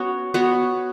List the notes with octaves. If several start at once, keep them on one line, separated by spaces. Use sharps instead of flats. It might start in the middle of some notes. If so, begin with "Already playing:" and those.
Already playing: B3 C#4 F#4 C#5
B3 F#4 C#5